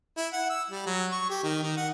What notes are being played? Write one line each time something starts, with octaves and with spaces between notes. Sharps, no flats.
E4
F#5
E6
G3
F#3
C#6
G4
D#3
D#3
F#5